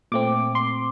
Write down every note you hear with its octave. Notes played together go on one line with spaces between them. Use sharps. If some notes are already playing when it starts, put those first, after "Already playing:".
A#2 A3 C4 D6
C6